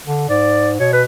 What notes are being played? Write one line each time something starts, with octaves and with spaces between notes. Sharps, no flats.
D3
G#2 D5
B2 C#5
B4